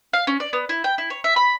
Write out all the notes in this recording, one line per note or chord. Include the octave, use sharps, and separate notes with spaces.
F5
C#4
D5
B3
E4
G5
E4
C#5
E5
B5